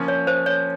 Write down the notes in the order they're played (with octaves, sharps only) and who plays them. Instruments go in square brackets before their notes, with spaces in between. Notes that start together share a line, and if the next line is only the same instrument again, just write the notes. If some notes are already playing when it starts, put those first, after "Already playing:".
Already playing: [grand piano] F3 A#3 C#4
[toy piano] C#5
C5
C#5